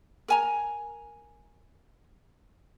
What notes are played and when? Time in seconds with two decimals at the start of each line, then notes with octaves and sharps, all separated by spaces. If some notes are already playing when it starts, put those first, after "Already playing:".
0.28 A#4 G#5 A#5